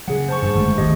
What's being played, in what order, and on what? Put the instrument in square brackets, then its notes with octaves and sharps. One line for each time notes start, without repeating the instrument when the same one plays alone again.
[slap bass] C#3 F#3 [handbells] G#4 F#5
[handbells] C5 A5 C#6
[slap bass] G2 F3 G3
G1 G#3 A3
[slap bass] G#1 D#2 [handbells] G4 D#5